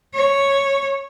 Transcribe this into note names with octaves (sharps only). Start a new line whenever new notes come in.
C#5